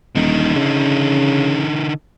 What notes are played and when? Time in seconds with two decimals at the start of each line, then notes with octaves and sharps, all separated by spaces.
0.15 D#1 D3 D#4
0.55 C#3